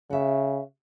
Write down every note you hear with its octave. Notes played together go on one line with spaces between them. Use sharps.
C#3 F#4 E5